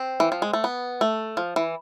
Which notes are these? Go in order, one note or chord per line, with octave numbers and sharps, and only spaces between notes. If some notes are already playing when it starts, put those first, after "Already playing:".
Already playing: C4
E3
F3
G#3
A3
B3
A3
F3
E3